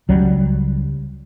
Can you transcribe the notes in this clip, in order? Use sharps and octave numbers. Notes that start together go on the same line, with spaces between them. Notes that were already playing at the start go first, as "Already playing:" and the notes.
C#2 F#3 G3